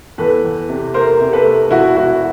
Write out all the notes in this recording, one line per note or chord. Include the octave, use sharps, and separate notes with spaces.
E2 A4 B4
E2
C3
A3 A#4 C5
C3
A4 B4
A3
E1 E4 F#4
E1 E4 F#4